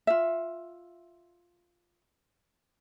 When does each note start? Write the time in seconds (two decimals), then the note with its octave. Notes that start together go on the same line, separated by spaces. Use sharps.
0.07 F4 E5